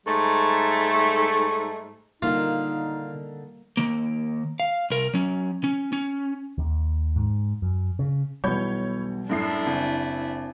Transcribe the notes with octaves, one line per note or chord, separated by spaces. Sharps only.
G#2 G3 A3
D3 D#3 G3 A#3 D#4 F4 A#4
D#3 A#3
F5
C2 A#4
F#3 C#4
C#4
C#4
D#2
G#2
F#2
C#3
B1 E2 G3 B3 C#5 B5 G6
F#2 A2 D4 E4 C7
F#1 C4 G#5